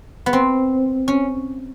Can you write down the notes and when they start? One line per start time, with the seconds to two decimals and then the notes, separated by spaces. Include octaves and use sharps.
0.26 B3
0.33 C4
1.08 C#4